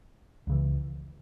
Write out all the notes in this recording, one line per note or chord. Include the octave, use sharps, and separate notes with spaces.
C#2 C#3 E3